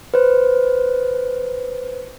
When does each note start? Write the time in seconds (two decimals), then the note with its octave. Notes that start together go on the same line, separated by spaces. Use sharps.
0.14 B4 C5